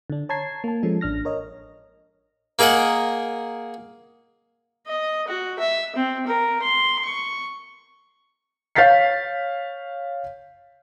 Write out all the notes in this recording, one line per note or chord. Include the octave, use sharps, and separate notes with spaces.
D3 D4
C#5 A5 A#5 G#6 C7
A#3 A5
F3 G#3 C#4 A4
A1 D4 F6 A#6
A#4 C#5 D#5
A#3 G#4 A#4 D#5 F#5
D#5
F#4
E5
C4
A#4
C6
C#6
C#5 F5 G6 A6 B6 C7